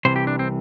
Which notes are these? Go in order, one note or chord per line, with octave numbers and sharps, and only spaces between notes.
C2 C3 E3 C5
G4
D4
C4